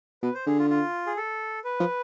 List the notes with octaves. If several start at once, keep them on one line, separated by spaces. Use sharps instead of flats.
B2 B4
C5
D3 G#4
F4
F4
G#4
A4
B4
F3